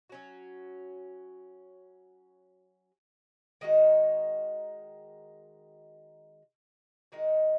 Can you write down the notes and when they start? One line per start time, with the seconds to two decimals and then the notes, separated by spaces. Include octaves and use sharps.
0.10 F#3 C#4 F#4
3.61 D#3 G#3 D#4 F#4
7.12 D#3 G#3 D#4 F#4